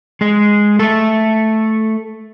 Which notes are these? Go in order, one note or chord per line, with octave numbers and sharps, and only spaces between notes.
G#3 G#4
A3 A4